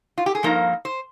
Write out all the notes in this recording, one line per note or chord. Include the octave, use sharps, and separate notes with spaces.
F4
G4
G#4
G2 F3 A#3 D#4 A#4
C5